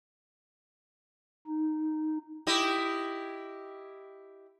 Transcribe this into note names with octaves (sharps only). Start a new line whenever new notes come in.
D#4
E4 G4 D#5